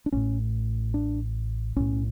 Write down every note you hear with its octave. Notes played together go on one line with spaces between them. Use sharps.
D4
A1 A2 C#4
D4
B1 A2 C#4